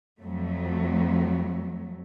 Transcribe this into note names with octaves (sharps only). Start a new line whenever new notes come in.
F2 F#3 A3